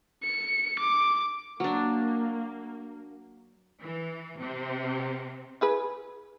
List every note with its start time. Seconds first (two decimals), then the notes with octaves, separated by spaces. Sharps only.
0.23 C#7
0.80 D6
1.60 F#3 A#3 D4
3.81 E3
4.39 C3
5.61 E4 G#4 B4